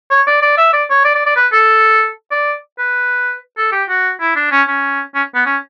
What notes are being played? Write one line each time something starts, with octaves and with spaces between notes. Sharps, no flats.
C#5
D5
D5
E5
D5
C#5
D5
D5
D5
B4
A4
D5
B4
A4
G4
F#4
E4
D4
C#4
C#4
C#4
B3
C#4